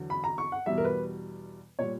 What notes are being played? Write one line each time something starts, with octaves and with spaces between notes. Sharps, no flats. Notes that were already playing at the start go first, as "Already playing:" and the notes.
Already playing: E2 D3 F#3
B5
A#5
C#6
F#5
E2 B2 G3 E5
A#4
B4
A#2 G3 C#5